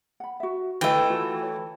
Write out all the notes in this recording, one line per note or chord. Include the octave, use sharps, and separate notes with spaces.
F#5 B5
F#4 E5
E3 A3 B4 D#5 G5
F4 F#4 A4
C#5